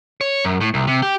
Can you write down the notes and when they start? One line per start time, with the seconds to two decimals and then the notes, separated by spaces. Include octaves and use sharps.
0.21 C#5
0.45 F#2
0.61 A2
0.74 C2
0.87 C3
1.02 G4